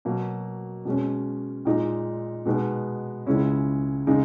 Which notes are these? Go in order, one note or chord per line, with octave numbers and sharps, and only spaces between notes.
B2 F#3 A#3
B2 G#3 C#4
A#2 G#3 D#4
B2 G#3 B3 D#4
C#2 C#3 G#3 C#4 E4
C#3 G#3 D#4